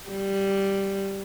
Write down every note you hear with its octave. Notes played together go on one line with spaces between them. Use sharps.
G3